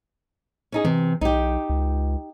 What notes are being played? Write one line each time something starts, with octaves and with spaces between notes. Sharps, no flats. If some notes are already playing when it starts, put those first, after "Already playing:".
C#4 D#4 G#4
C3 E3
B1 D#4 G4
C#2